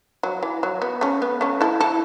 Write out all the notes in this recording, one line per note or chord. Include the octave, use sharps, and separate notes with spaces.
F#3
E3
F#3
B3
A3 C#4
B3
A3 C#4
E4 A4
E4 A4